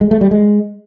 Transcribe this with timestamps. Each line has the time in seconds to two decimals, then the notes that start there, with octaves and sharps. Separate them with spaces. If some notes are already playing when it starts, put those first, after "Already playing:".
0.01 G#3
0.11 A3
0.21 G3
0.31 G#3